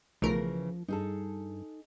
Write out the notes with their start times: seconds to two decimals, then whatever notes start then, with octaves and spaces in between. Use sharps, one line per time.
0.22 B1 C#3 E3 F3 A3 A#4
0.88 G2 D#4 G#4 A4